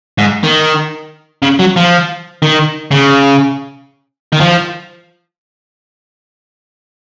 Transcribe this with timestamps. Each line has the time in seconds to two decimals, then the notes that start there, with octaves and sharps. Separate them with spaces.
0.18 G#2
0.44 D#3
1.42 C#3
1.59 F#3
1.76 F3
2.42 D#3
2.91 C#3
4.33 D#3
4.40 F3